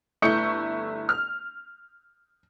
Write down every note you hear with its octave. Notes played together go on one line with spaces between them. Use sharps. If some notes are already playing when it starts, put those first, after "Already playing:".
G1 A3 E4 C#6 G6 C#7
F6